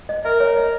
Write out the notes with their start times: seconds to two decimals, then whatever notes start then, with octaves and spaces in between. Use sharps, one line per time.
0.09 D#5
0.25 A#4 E5
0.40 C#5
0.57 D#5